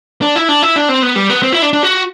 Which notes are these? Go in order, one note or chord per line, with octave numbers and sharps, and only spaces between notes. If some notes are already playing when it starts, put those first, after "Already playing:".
D4
E4
D4
E4
D4
C4
B3
G3
B3
C4
E4
D4
D4
F#4